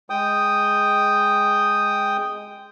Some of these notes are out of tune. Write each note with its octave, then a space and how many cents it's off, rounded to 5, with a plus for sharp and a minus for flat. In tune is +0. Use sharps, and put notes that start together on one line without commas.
G#3 +0 G5 +0 D#6 -5